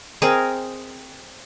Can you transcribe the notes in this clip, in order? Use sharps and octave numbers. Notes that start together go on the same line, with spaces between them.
C4 G#4 A#4 D#5